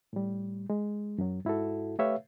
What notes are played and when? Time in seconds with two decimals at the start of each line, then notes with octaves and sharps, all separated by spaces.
0.13 A2 G3
0.70 G#3
1.18 F#2 F#3
1.45 G#2 E4 F#4 A4
1.99 A3 G4 B4 C#5 E5 F5